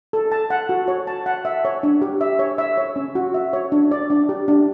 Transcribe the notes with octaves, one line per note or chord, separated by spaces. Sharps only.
A4
A5
F#5
F#4
C#5
A5
F#5
E5
C#5
D4
G4
E5
C#5
E5
C#5
C#4
F#4
E5
C#5
D4
D5
D4
G4
D4